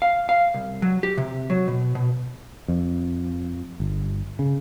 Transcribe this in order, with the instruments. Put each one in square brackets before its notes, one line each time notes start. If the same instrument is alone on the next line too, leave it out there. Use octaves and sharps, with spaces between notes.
[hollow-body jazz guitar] F5
F5
C2
F#3
G4
C3
F#3
B2
B2
[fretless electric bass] F2
G1
C#3